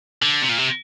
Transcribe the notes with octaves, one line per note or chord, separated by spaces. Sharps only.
D3
C3
A#2
C3